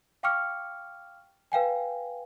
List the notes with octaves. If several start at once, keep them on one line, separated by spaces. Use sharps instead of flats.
F5 G5 C#6 D6 F6 C#7
B4 F5 G5 G#5